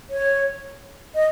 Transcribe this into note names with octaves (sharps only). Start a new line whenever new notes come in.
C#5
D#5